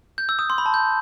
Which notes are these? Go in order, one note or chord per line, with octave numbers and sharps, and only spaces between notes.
G6
E6
D#6
C6
B5
A5
G6